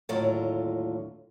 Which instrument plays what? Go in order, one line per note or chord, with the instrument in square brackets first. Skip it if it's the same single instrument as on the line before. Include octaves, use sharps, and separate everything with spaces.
[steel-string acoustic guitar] D#2 A2 D3 F#3 F4